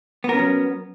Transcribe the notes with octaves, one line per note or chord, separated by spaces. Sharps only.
F#3 B3 C#4 A#4